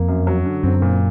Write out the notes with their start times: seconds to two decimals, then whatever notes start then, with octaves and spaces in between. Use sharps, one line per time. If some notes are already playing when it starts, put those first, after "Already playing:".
Already playing: F2 A#3
0.08 F#2
0.27 F#3
0.45 D3
0.63 F#2 C4
0.82 A#2